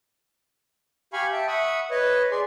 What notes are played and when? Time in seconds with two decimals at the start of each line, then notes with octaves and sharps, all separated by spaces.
1.13 G4 F5 G#5 B5 C#6
1.32 E5 G5 A5
1.47 E5 F#5 B5 C#6 D#6
1.91 B4 C#5 D#5
2.31 G#4 D5 C6